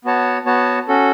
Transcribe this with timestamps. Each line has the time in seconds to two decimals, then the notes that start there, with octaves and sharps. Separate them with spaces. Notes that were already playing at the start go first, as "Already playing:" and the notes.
0.05 B3 F#4 C#5 A5
0.46 B3 F#4 C#5 A5
0.88 C#4 F#4 A4